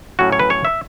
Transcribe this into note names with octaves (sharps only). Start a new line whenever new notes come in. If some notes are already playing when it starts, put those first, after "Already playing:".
A2 F#3 C#4 F#4
C#5
B4
C#5
E5